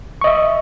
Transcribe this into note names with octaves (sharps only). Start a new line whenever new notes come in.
D#5 E5 C#6